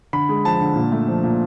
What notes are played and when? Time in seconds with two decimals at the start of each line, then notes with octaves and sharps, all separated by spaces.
0.13 D3 B5
0.29 G#3
0.45 F3 A5
0.61 D3
0.76 A#2
0.92 A3
1.08 F3
1.23 A#2